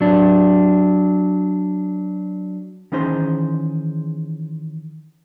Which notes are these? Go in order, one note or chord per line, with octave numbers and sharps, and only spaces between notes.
F#3 D4
D#3 E3 C#4 D#4 G#4 C5